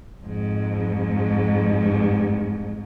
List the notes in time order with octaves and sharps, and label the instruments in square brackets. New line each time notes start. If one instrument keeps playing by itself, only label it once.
[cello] F2 G#2